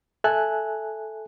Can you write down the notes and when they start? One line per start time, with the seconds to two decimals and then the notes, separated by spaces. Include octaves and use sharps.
0.24 A4 E5 G#5 A5 F#6